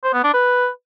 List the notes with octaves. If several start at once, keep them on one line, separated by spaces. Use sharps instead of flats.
C5
B3
D4
B4